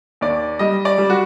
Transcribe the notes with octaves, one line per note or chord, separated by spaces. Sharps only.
D#2 D5
G3 D#5
D5
G3
F#4